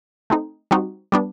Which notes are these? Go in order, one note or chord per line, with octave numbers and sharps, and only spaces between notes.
A3 C4 D#4
G3 C4 D#4 F#4
G3 B3 D4